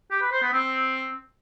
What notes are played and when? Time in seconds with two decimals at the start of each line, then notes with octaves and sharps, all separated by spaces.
0.11 G4
0.22 B4
0.32 C5
0.43 B3
0.53 C4